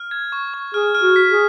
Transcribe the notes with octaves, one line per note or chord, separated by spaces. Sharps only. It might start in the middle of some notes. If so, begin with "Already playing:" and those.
Already playing: F6
G#6
C#6
C#6
G#4 F6
F6
F#4
B6
G#4